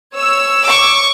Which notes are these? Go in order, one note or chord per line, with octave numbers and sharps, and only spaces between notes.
C#5 E6
C#6 D6